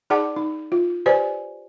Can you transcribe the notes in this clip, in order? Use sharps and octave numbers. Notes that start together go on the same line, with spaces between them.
D#4 G#4 D5 F#5 A5 D6
D#4
F4
G4 B4 C5 D5 G#5